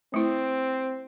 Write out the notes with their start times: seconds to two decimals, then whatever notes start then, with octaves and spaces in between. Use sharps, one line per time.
0.14 A3 C4 E4